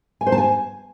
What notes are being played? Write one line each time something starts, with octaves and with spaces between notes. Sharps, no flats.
G#5
C5
A5
G#5